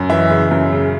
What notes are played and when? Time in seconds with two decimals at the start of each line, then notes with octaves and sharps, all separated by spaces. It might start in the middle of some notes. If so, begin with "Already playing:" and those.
Already playing: F#2
0.10 E3 E5
0.30 C#3
0.51 F#2
0.72 C#3